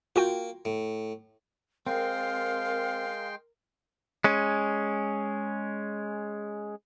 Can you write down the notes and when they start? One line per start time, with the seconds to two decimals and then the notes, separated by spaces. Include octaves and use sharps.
0.16 A#3 F4 F#4 G5
0.65 A2
1.87 G#3 C4 A#4 F5 G5 C6
4.24 G#3 C#4